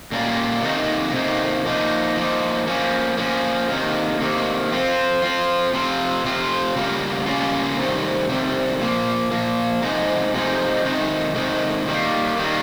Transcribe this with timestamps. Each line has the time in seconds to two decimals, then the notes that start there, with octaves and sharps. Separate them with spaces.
0.12 A#2 G3 A#3 C#4 F4
0.62 C3 D#3 A#3 D#4
1.13 C3 D#3 A#3 D#4
1.65 F3 A#3 D#4
2.16 F3 A#3 D#4
2.67 F3 A#3 C#4
3.18 F3 A#3 C#4
3.69 C3 D#3 A#3
4.20 C3 D#3 A#3
4.71 F3 C4 F4
5.22 F3 C4 F4
5.73 C3 F3 C4 F4
6.25 C3 F3 C4 F4
6.76 C#3 G3 A#3 C#4 F4
7.26 C#3 G3 A#3 C#4 F4
7.77 C3 D#3 G3 C4
8.29 C3 D#3 G3 C4
8.80 A#2 F3 A#3
9.31 A#2 F3 A#3
9.83 C3 F3 G#3 D#4
10.33 C3 F3 G#3 D#4
10.84 C3 D#3 G#3 D#4
11.35 C3 D#3 G#3 D#4
11.86 D#3 G3 A#3
12.37 D#3 G3 A#3